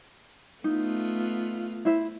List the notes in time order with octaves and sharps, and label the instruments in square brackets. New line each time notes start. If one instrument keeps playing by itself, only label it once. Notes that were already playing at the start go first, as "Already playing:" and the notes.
[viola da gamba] A3 B3 F4 [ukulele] D#4
[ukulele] E4 C5 E5